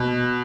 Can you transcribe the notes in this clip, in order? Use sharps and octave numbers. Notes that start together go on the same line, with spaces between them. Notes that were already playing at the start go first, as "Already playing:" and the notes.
Already playing: B2